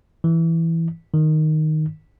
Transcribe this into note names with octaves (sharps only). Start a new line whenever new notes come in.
E3
D#3